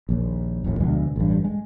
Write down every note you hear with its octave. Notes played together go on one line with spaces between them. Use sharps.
A#1 D#2
D#1 A#1 D#2 A2
D2 B2 F3 G#3
A1 G2
G#3